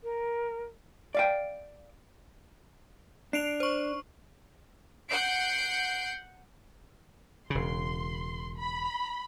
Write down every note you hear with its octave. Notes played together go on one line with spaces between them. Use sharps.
A#4
D5 F5 G5
D4 C7 D7 F7
C5 C#6
F#5 G6 C7 D7
E1 C#3 C6
B5